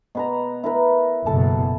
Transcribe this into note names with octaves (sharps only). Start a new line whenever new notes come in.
B2 B4 A#5
E4 A#4 B4
F#1 B2 A4 A5